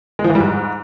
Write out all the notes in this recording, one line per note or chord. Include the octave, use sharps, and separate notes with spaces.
G#3
F3
E3
G3
G#2